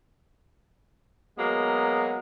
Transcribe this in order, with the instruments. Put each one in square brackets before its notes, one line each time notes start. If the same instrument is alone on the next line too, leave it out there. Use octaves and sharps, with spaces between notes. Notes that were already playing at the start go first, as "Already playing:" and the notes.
[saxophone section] F#3 G#3 A#3 B3 G#4